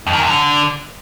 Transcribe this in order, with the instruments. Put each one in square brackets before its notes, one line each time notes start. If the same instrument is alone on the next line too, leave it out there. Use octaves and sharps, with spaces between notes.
[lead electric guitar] F2
D#3
E2
D3